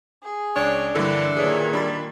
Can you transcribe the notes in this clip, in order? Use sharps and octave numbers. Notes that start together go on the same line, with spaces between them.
G#4
C#2 D4 C#5
G2 D3 E3 G3 A#3 E4 A4
A#2 D#3 G#4 B4 C#5 G#6
G3 D4 B5 A6